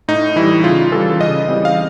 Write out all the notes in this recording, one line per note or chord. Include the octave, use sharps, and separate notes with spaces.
A2 D#4
E3 G3 E4
C#3 F4
E3 G3 A4
C#3 D#5
E3 G3 C4
F5